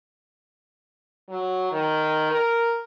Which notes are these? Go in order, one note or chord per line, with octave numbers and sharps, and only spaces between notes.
F#3
D#3
A#4